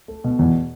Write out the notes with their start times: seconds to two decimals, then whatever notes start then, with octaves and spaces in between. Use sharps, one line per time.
0.08 A3
0.24 B2
0.39 E2